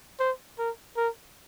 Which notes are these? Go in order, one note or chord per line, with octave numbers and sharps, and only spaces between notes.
C5
A#4
A#4